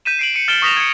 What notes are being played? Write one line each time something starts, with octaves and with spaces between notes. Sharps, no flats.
G6 B6 D#7 E7
C7 D7 F#7
C#7 D#7
F6 A6 D7 E7 G7
C#6 D#6 A#6 B6 E7 F7
G#6 C#7